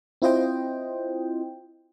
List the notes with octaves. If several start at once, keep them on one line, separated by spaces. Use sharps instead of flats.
C4 E4 F4 C5 D#5 G5